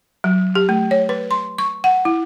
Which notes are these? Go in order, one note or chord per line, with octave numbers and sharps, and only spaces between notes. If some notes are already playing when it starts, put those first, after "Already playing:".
F#3
G4
A3
C#5
B4
C6
C#6
F#5
E4